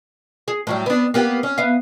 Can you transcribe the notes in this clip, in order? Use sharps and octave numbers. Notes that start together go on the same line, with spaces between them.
G#4
A2 F#3 G3
B3 D4
A#3 B3 G4
C#4
B3 E5 F5